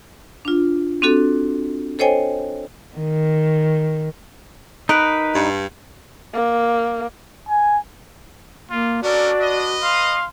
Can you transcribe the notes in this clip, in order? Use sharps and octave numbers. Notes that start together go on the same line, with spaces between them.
D4 F4
C4 D4 F#4 A4
A4 C5 C#5 D#5 G5 G#5
D#3
D#4 A#4 B4
G2
A#3
G#5
A#3 F4
C#4 D4 F#4 A4 A#4 D5
B4 D#5
F5 C6